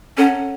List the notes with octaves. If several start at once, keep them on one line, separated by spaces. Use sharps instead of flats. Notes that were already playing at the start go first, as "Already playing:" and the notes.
C#4 A4 C#5 F#5 A#5